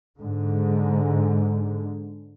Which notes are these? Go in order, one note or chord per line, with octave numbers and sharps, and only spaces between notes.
G#2 D3